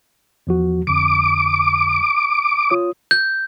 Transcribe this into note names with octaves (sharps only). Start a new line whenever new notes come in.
E2 F3 F#4
F2 D3 D6
F4 C#5 D#6
G6